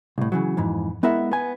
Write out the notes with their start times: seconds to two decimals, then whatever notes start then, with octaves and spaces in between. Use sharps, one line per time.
0.18 C2 A2
0.32 C#3 E3 F#3
0.57 F2 G#2 E3
1.03 G#3 B3 E4 A#4 E5 F#5
1.31 B3 G#5